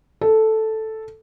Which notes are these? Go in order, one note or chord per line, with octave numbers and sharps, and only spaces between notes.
A4